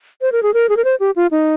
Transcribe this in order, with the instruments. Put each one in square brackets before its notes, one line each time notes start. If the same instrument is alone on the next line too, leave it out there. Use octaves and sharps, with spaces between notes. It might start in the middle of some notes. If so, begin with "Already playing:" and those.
[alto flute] C5
A#4
G#4
A#4
G#4
A#4
C5
G4
F4
D#4